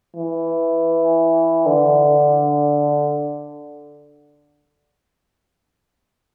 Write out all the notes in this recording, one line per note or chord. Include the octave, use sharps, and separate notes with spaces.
E3
D3